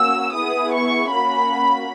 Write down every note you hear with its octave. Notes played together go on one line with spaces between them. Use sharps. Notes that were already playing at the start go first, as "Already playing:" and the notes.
Already playing: A#3 C#4 F#4 E6
B3 E4 G#4 D#6
C#6
A#3 C#4 F#4 B5